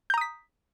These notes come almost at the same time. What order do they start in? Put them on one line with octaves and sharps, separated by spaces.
G6 A#5 D#6 B6